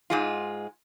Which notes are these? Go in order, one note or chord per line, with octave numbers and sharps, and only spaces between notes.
G#2 G#3 F4